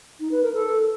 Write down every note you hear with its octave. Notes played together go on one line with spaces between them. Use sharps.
D#4
B4
A#4
A4